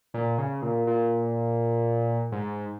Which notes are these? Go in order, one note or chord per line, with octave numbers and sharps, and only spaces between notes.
A#2
C#3
A#2
A#2
G#2